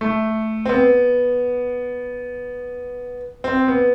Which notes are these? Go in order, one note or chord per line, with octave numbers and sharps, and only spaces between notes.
A3
C4
B3
C4
B3